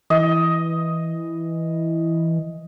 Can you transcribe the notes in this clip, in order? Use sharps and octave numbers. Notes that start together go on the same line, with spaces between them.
E3 D#5